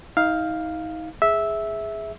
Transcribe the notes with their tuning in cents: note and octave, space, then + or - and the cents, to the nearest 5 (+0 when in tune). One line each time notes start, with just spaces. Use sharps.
D#4 +35 F5 +0
G#4 +0 E5 -10